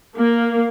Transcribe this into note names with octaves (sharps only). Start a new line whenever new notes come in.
A#3